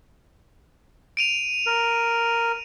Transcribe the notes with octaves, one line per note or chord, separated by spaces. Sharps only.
D7 D#7 F7
A#4